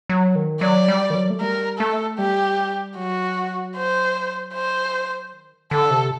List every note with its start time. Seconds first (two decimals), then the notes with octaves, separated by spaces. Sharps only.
0.09 F#3
0.36 D#3
0.61 F#3 D5
0.88 G3
1.10 D#3
1.15 F#3
1.30 A3
1.41 G3 A#4
1.79 A3 A4
2.18 G3 G4
2.97 F#3 F#4
3.76 C5
4.53 C5
5.33 D#3
5.71 D3 A4
5.91 C3